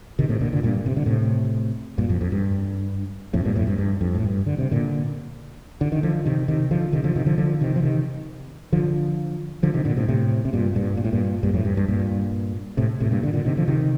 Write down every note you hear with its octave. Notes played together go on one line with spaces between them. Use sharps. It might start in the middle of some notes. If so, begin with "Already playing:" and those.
C3 D#3
A2 C3
A#2 D3
A#2 D3
G2 A#2
C3
D3
A2 C3
G2 A#2
F2
F2
G2
F2 A2
C3
G2 A#2
F2 A2
G2
G2
F2
A2
G2
D3
C3
A#2 D3
D3
D#3
D3 F3
C3 D#3
C3 D#3
D3 F3
C3 D#3
D3 F3
C3 D#3
D3 F3
D3 F3
C3 D#3
F3
C3 D#3
D3 F3
D3 F3
C3 D#3
A#2 D3
A2 C3
A2 C3
C3
G2 A#2
G2 A#2
A#2
A2
G2 A#2
G2 A#2
F2 A2
G2
G2
G2 A#2
A2 C3
A2 C3
G2 A#2
A#2 D3
A#2 D3
C3 D#3
D3 F3
C3 D#3